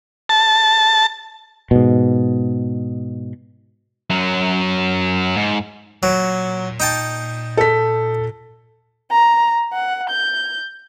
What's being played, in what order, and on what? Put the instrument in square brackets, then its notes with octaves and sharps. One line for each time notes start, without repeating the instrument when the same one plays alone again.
[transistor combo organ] A5
[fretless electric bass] G#2 B2
[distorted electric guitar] F#2 F#3
G#2
[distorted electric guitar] A#2 [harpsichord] F#3
[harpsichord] D#4 G5 A5
[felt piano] A4 B6
[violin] A#5
F#5
G6